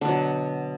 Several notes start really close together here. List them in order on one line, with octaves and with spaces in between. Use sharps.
D3 B2 F#3